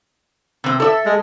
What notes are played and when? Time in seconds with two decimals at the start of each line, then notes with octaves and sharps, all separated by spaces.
0.64 C3 C4
0.80 A4 D5 E5
1.06 G#3